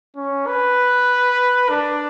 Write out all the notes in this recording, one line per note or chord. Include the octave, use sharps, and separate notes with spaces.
C#4
B4
D4